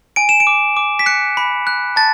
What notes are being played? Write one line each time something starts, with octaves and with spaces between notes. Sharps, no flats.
G#5 D7
E7
D7
D6
D6
B6
F#6 C#7
B5
F#6
A5 A6